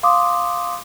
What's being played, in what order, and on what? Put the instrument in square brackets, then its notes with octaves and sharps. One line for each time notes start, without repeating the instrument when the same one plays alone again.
[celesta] F5 C6 D6 D#6